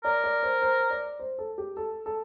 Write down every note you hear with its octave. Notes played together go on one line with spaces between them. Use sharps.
A#4 D5
D5
C5
C5
D5
C5
A4
G4
A4
A4